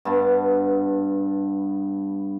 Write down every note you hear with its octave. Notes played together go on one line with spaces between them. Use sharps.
G2 B3 A5